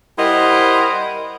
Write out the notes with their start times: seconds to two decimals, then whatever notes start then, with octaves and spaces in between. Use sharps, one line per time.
0.19 G3 E4 A#4 C5 D#5 F#5